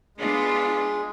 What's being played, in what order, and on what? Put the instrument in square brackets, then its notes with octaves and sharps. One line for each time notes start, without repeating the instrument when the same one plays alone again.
[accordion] G#3 [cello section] B3 D4 F4